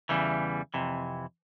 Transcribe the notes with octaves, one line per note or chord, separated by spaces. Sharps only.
E2 C#3 E3 G3
F2 C3 E3